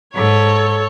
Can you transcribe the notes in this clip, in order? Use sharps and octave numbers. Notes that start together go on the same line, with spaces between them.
G#2 A4 C#5